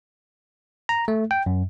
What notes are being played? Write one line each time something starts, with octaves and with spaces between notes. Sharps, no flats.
A#5
A3
G5
F#2